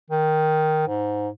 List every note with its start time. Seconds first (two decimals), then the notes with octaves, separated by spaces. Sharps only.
0.10 D#3
0.88 G#2